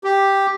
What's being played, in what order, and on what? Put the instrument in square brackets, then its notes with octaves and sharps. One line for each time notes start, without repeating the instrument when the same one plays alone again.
[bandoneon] G4